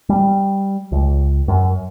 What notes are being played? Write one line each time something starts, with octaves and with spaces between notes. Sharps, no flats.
G3
C#2
F#2